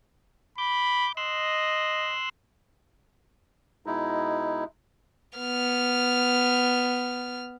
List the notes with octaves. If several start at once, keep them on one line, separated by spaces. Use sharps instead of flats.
B5 D6 G6
D#5 C6 E6 F#6
B2 G#3 D#4 E4
B3 F6